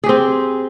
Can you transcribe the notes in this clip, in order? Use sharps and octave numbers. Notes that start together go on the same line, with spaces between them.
C4 G4 G#4